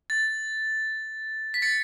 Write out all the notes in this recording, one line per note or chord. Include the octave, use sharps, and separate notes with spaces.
A6
B6
A6 C#7